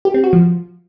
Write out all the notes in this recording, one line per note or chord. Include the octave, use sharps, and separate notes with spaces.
G4
C4
F#4
F3